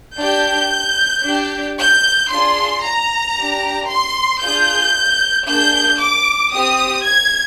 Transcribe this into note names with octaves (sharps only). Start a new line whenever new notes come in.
D4 G4 G6
D4 G4
G6
D4 F4 G#4 C6
A#5
D4 G4
C6
D4 F4 G#4 G6
A#3 D4 G#4 G6
D6
C4 G4 D#6
G#6